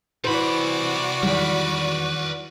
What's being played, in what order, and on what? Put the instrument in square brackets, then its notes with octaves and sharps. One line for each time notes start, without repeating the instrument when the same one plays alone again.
[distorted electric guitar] C3 B5 [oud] E3 C5 [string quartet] F#4 D5
[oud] E2 [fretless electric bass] D#3 F#3 G3 [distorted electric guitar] A#4 B4